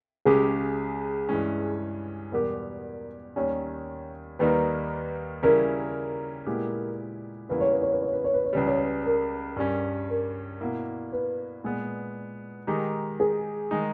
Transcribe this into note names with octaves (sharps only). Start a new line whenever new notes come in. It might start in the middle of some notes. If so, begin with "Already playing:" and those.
C#2 C#3 G#3 C#4 G4 G#4
G2 E3 G#3 C#4
E2 B2 G3 B3 G4 A#4
D#2 D#3 G3 C#4 C#5
D#2 D#3 G3 A#3 D#4 B4
C#3 E3 G3 C#4 E4 A#4
A#2 G#3 B3 E4 G4
E2 C#3 G3 A#3 E4 B4
C#5
B4
C#5
B4
C#5
B4
C#5
B4
C#5
C#2 C#3 G3 B4
C#5
B4
A#4
G2 G3 C#4
A#4
B2 A#3 E4
B4
A#2 G#3 B3
D#3 G#3 D#4 G4
G#4
D#3 G#3 D#4